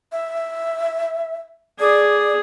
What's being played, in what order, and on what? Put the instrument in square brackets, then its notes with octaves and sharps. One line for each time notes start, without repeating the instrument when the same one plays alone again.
[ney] E5
[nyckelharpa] G#4 [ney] D5